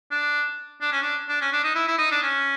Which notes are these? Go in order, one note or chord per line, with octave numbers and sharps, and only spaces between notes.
D4
D4
C#4
D4
D4
C#4
D4
D#4
E4
E4
D#4
D4
C#4